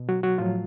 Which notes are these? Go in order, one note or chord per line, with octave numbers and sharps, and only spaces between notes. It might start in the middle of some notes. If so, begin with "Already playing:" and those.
Already playing: B2
F#3 F#4
F#3 F#4
A2 F3 F#3 F4